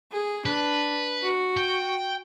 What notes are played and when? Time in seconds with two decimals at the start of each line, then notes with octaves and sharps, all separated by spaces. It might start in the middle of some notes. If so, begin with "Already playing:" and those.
0.12 G#4
0.46 D4 B4
1.22 F#4
1.57 G5